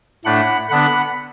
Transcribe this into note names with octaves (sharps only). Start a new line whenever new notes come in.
A2 A3 D4 F#5 B5
D3 B3 D4 F#5 B5